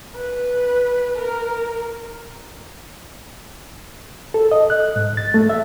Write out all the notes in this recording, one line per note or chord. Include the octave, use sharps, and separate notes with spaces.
B4
A#4
A4
D#5
F#6
G#2
A6
A3
E5